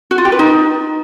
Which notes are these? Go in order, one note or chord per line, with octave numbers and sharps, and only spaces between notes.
F#4
F4
G4
B4
D#4